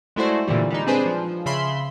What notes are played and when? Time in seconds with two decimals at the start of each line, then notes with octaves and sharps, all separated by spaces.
0.16 G#3 A3 E4 F#4 C5 D5
0.47 A#2 D3 E3 G3
0.71 G3 G#3 D#4
0.87 C4 D4 G#4 B4 C5
1.06 F3
1.46 C#3 E5 B5 C6